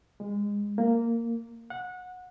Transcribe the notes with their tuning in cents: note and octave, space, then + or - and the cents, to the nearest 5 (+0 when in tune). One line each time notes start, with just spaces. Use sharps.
G#3 -20
A#3 -10
F#5 -20